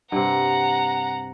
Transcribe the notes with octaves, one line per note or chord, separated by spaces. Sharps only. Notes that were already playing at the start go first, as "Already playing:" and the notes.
G2 C3 F#5 A#5